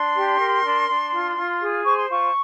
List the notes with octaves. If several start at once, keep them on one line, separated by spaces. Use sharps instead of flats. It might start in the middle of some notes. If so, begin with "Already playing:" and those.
Already playing: D4 C6
G4
A#4
D4
D4
F4
F4
G#4
C5 C#6
C6
F4 C#6